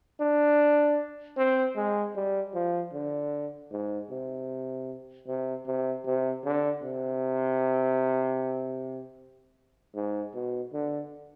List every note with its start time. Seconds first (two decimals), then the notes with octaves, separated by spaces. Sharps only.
0.21 D4
1.37 C4
1.76 G#3
2.16 G3
2.54 F3
2.94 D3
3.72 G#2
4.11 C3
5.28 C3
5.67 C3
6.06 C3
6.45 D3
6.83 C3
9.95 G#2
10.35 B2
10.74 D3